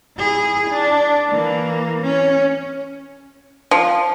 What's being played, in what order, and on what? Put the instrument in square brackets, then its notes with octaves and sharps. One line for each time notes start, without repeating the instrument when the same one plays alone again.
[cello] E4 G#4
D4
E3 A#3
C#4
[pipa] F3